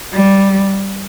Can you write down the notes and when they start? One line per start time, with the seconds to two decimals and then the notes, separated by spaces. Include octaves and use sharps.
0.12 G3